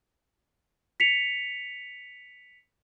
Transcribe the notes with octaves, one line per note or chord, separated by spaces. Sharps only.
B6 C#7 F7